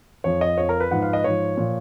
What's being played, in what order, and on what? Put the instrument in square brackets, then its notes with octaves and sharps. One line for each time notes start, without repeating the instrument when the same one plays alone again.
[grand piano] F2 F3 C#5
D#5
F2 F3 C#5
A#4
B4
G#2 F3 F#5
F5
D#5
G#2 F3 C#5
A#2 F3